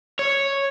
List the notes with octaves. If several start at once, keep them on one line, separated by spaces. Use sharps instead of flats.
C#5